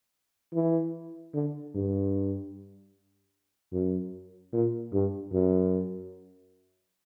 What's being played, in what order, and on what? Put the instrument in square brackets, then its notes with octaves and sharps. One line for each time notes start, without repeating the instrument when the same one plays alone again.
[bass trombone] E3
D3
G2
F#2
A#2
G2
F#2